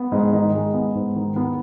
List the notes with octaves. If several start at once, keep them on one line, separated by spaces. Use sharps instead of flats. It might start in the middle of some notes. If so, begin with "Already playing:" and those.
Already playing: B3
G#2 D#5
D#3 D#5
G#3
B3
G#2
D#3
B3